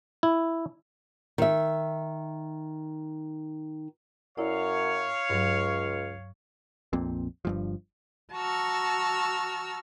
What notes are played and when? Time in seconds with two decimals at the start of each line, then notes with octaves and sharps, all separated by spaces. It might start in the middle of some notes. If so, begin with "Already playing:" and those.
0.23 E4
1.38 D#3 E5
4.38 F#2 E4 C#5 D5 F5
5.30 C#2 G2 F#3
6.93 A#1 F2 A#2 C4
7.45 G1 G2 F3
8.33 F#4 A5 A#5 C#6 E6 F6